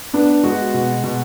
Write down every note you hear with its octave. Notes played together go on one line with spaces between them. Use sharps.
B3 D4
G#3 F#4
B2
B2